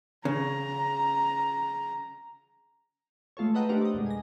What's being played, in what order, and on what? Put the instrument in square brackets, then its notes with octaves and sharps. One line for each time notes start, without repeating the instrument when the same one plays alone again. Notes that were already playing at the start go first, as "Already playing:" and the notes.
[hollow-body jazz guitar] C#3 [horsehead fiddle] A#5
[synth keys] G#3 A3 F4 A4 C#5
A4 B4 D#5 F#5 G5 A#5
A3 D4 G4 A#4 C5 F#5
D5 D#5
F2 B2 G#3
G#5 A#6